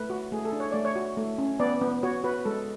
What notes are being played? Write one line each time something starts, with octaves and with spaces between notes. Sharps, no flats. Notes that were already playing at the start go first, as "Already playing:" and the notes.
Already playing: A3 B4
F#4
A3 G#4
A4
D4
C#5
A3 D5
C#5
F#4
A3
C#4
B3 D5
B3
F#4 C#5
F#4 B4
G#3 A4